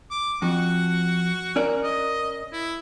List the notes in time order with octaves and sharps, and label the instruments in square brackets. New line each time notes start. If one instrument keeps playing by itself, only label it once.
[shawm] D6
[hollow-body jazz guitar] F2 [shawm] F#4
[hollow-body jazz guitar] C#4 A#4 D5
[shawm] D#5
E4